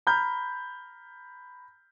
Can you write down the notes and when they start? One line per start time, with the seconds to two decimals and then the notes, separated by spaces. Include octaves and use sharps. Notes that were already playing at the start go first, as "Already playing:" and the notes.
0.07 A#5 B5 F6 G6